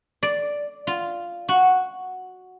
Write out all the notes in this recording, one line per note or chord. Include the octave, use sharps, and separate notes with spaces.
D5
F4
F#4